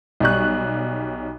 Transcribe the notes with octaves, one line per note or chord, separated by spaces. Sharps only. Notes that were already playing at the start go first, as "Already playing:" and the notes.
B1 G3 C#6 F#6